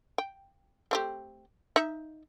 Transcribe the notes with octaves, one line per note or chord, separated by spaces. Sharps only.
G5
A3 C4 G4
D#4 E5